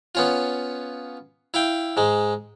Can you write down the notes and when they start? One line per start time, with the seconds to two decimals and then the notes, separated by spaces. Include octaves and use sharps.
0.15 B3 C#4 F4
1.54 E4 F5 G5
1.97 G#2 G#3